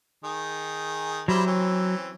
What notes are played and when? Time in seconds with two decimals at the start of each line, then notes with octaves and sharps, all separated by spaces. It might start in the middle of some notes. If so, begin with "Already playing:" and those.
0.24 D#3 G#4
1.28 F#3 G3 E4 C5
1.47 E3 C4 C#4